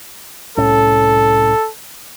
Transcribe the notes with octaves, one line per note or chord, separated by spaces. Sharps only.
C2 A2 C#4 A4